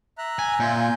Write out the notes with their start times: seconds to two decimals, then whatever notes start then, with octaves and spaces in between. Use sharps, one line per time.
0.18 E5 A#5 F#6
0.39 G#5
0.60 A#2 F4 G#5 G6